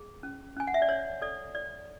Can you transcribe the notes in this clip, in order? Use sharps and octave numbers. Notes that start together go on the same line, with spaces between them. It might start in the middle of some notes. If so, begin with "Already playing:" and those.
Already playing: G#4
C#4
C#4 G#5
F#5
E5
D5
C#5
A4 D5
C#5 D5